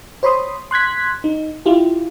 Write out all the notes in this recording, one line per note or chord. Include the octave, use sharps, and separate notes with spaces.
C5 C#5 B5 C6 D#6
C6 F#6 G#6 B6
D#4
E4 F4 G4